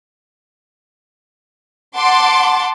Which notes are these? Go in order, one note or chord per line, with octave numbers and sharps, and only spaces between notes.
F#5 A5 C6 D6